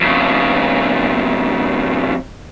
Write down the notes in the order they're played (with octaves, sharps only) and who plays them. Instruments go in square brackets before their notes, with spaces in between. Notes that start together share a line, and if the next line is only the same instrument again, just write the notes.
[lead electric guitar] F2 C#3